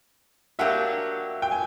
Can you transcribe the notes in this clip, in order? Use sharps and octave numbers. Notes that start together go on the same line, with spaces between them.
F#3 A#3 D4 G4 E5 F#5
G5
G#5